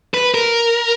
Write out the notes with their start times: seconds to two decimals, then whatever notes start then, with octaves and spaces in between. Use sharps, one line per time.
0.14 B4
0.34 A#4